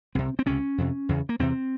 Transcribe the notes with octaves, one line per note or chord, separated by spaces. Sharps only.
C2 C3 C4
C4
C#2 C3 C#4
F2 C3
E2 C#3
A#3
E2 C3 C4